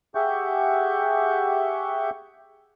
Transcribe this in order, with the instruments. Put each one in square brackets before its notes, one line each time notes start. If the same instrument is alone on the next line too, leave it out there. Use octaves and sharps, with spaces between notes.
[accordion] G4 G#4 E5 F#5 C#6 G6